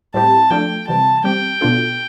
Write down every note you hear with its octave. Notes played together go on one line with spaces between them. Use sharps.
A2 G3 C4 E4 G4 A5
F3 A3 D4 F4 A4 G5
C3 E3 G3 A5
G3 C4 G4 G5
B2 B3 D4 F4 A4